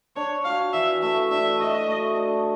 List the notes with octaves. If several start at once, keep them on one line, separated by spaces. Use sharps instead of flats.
D4 C#5
F#4 F5
E3 E5
A3 E5
D4 E5
F#4 D#5
A3
D4